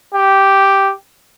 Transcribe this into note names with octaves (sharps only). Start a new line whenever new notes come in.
G4